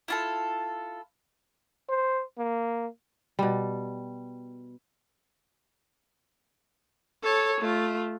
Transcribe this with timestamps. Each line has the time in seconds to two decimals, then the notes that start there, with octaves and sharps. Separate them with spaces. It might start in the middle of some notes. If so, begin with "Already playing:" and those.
0.08 E4 F4 A4
1.90 C5
2.38 A#3
3.39 B2 G3
7.23 A4 C#5
7.61 A3 F4